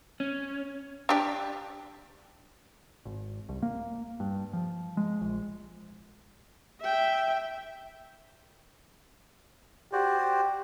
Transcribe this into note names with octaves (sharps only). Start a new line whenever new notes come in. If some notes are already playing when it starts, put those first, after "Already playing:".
C#4
D4 G4 D5
G#1
C2
A#3
G2
F3
G#3
A#1
E5 G5
F#4 G4 C5 D5